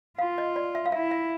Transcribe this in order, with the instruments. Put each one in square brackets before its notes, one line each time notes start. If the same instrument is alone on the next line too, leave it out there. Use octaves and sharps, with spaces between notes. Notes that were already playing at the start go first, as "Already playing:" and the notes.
[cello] F4 [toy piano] F5
[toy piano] D#5
D5
E5
F5
[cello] E4 [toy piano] E5
[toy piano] E5